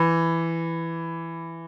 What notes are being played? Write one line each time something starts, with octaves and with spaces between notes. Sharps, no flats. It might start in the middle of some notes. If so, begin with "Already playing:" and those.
Already playing: E3